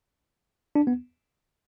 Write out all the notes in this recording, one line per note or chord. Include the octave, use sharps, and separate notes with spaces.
D4
B3